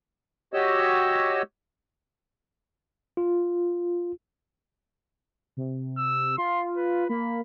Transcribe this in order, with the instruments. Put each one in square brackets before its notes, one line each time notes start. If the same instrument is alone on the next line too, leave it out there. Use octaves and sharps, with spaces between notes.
[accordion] F#4 G4 C#5 D#5 E6
[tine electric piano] F4
[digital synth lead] C3
[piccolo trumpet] E6
[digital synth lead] F4 [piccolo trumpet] C6
[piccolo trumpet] B4
[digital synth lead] A#3 [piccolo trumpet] B5